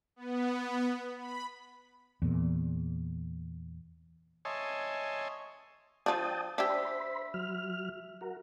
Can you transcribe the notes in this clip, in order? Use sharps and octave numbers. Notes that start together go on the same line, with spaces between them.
B3
B5
E2 A#2
C#5 D#5 E5 G#5 A5 C6
F3 D4 G5 A5 D#6
D4 G4 C5 E5 B5 E6 B6
F#3 F6
F#4 A#4